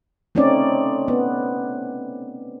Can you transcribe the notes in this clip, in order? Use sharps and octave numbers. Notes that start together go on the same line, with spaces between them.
A3 C4 C#4 D#4 D5
B3